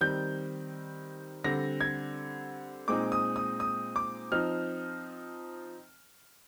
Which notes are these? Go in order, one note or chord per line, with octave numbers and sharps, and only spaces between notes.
D#3 G3 C4 G6
D3 G3 C4 A#6
G#6
A#2 G#3 C4 D#4 D6
D#6
D#6
D#6
D6
F3 C4 D#4 F6